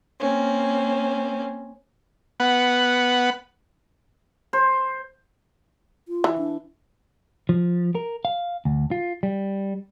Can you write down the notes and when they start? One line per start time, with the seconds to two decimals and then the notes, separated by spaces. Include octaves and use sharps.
0.21 A#3 C4 C#4
2.40 B3 F#5
4.53 C5
6.08 F4
6.24 E3
6.38 D4
7.49 F3
7.95 A#4
8.25 F5
8.65 D2
8.91 F4
9.23 G3